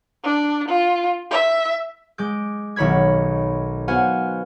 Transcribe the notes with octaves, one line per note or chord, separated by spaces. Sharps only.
D4
F4
E5
G#3 D6 G6
B1 D#3 C#5 B5 G#6
B3 F#4 C5 F5 G#5